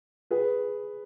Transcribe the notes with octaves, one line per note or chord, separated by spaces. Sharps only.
G#4 B4